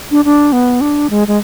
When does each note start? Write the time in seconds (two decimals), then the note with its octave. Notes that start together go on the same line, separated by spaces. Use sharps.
0.11 D4
0.25 D4
0.52 B3
0.81 D4
1.10 G#3
1.28 G#3